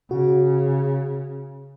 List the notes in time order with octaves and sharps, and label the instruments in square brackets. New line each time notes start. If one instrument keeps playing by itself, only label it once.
[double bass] C#3 [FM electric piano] F#4